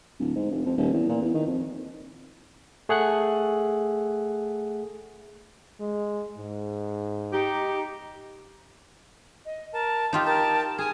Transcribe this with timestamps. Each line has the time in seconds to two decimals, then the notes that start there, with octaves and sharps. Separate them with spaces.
0.20 D1
0.36 G#2
0.50 F1
0.66 F2
0.77 D#1
0.93 E2
1.09 A#2
1.22 E2
1.34 D#3
1.47 F2
2.89 A3 G#4 F#5 F#6
5.80 G#3
6.37 G#2
7.33 D#4 G4
9.44 D#5
9.73 A#4 A5
10.13 D#4 F4 G4
10.25 A#4 G5 A5
10.78 G#4 G#5 D#6 F6